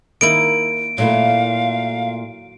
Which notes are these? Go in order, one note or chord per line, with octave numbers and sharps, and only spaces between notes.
D#3 A#3 E4 D7
A#2 F#3 A3 E4 F5